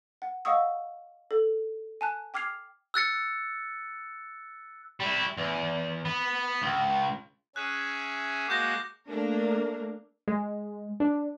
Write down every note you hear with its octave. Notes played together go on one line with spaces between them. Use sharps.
F#5
D#5 F5 F#5 C#6 D#6 E6
A4
G#5 A5 F#6
G5 D6 F6 G#6 C7 F7
E6 F#6 A6 C#7
G3 E4
E2
B3
C#2
C#4 G#4 E5 F#6
G#3 A#3 F#4 D6 G6 A#6
A3 A#3 D4 A#4
G#3
D4